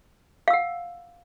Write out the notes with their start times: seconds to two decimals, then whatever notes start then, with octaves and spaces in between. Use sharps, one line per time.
0.48 F5
0.50 E6
0.53 F#5